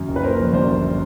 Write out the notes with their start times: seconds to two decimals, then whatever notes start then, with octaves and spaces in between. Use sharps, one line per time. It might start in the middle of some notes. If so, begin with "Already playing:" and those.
Already playing: F#2
0.08 F#1
0.16 B4
0.24 A#2 A#4 C5
0.39 A#1
0.53 F#2 C5 D5
0.68 G1